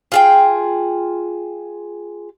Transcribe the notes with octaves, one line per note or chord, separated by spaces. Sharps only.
F4 G#4 G5